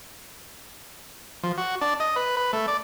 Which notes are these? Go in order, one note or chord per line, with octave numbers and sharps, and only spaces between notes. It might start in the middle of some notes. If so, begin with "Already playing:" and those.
F3
F#4
D4
D#5
B4
B4
A3
D5